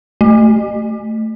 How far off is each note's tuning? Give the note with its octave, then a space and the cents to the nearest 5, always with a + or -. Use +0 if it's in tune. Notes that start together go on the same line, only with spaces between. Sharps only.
A3 +0